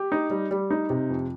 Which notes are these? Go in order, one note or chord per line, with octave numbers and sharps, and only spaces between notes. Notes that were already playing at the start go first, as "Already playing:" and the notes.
Already playing: G4
D#4
G3
G3
D#4
C3
F2